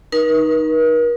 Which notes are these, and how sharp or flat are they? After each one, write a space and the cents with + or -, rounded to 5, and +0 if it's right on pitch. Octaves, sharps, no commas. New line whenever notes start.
D#4 +0 A#4 +45